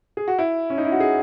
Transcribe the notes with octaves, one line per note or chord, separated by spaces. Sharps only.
G#4
F#4
E4
C#4
D#4
E4
F#4
G#4